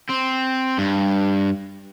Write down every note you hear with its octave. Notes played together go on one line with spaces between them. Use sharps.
C4
G2